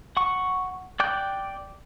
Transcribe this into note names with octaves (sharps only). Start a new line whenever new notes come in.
F#5 C#6
D5 G5 D6 F#6 G6